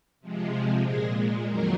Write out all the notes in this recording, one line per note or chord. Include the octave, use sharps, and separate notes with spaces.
C3 F3 G#3
A#2 G#3 G#4
F2 D#3 F#3 A#3 A#4